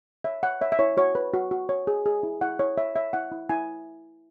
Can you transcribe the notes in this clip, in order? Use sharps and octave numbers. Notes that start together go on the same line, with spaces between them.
C#5 E5
C#5 F#5
C#5 E5
E5
E4 C#5
F#4 C#5
B4
F#4
F#4
C#5
G#4
G#4
E4
E4 F#5
E4 C#5
C#5 E5
C#5 E5
E4 F#5
E4
E4 G#5